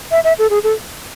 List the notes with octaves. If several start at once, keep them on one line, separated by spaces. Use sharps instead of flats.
E5
E5
A4
G#4
A4